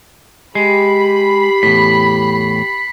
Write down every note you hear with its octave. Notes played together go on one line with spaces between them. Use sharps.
G#3 G4 B5 C7
E2 A2 B6